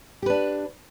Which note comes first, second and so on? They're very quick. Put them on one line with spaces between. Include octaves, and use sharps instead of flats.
G4 B4 D4